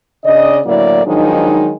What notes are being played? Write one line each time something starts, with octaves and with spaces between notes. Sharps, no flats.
C#3 D4 D5 D#5
A2 D3 F#3 A#3 E4 D5
D#3 F3 F#3 G#3 D4 D#4